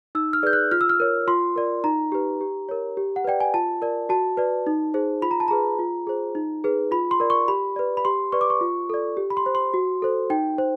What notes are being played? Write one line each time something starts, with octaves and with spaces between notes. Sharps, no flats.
D#4 E6
F6
G#4 B4 D5 G6
F#6
F4 F6
E6
F6
A#4 C#5
F4 C6
A#4 D5
D#4 A#5
G4 B4
G4
A#4 C#5
G4
F#5
B4 D5 G5
G#5
F4 A5
A#4 D5
F#4 A5
B4 D5
D#4
G#4 C5
F4 B5
A#5
A5
G#4 B4 A#5
F4
G#4 C5
D#4
G#4 B4
F4 B5
C6
A#4 D5
C#6
G4 B5
B4 D5
B5
G4 C6
B4 D5 C#6
D6
C#6
F4
A4 D5
G4
B5
C6
C5
C6
F#4
A4 C5
D#4 G5
C5